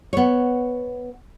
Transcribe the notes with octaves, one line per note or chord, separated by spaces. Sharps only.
B3 C#5